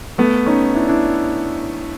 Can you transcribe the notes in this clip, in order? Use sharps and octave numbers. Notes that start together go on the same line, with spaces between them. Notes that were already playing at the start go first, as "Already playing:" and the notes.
A3 B3
C#4 D#4
D4 E4
D4 E4